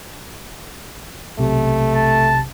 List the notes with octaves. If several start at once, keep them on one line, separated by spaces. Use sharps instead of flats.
B1 C3 A3
A5